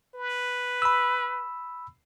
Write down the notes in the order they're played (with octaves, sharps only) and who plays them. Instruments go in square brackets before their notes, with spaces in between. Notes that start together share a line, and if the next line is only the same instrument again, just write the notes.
[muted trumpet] B4
[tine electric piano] B5 E6